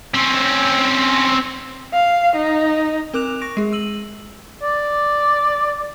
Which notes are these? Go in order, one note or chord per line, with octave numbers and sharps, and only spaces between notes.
C4 C#4
F5
D#4
C4 A#4 D6 F#6 E7 F7
C#6 A#6 D7
G#3 G#4
E6 D#7 F#7
D5